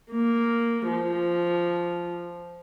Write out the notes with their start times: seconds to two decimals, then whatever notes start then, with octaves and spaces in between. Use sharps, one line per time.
0.12 A#3
0.87 F3